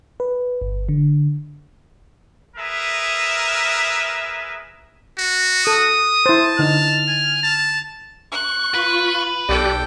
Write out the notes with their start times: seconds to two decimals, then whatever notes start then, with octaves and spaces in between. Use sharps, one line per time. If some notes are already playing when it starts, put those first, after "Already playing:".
0.20 B4
0.62 G1
0.89 D3
2.56 G#4 A#4 B4 E5
5.18 F#4
5.67 A4 D#6
6.26 E4 C5 A5
6.59 D3 D#4 F6
7.08 G#5
7.43 A5
8.32 C#6 F#6
8.75 F4 B4
9.49 B1 G4 A4 D5 G5 F#6